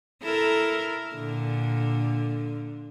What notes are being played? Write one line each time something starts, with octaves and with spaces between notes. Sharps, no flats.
E4 A4 A#4
A#2 D3